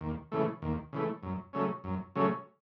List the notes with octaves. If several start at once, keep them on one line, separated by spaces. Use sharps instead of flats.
D#2
C#3 E3 A3
D#2
C#3 E3 A3
F#2
C#3 F#3 A3 C#4
F#2
C#3 F#3 A3 C#4